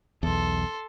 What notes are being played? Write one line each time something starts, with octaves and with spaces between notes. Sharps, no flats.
B1 E2 A4 C6